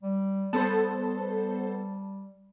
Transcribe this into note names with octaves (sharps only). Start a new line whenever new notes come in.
G3
G3 B3 A4 C5 A5